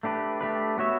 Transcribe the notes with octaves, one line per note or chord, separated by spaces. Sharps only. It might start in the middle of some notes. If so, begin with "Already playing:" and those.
A3 D4 G4 B4
A3 D4 G4 B4
B3 F#4 C#5 E5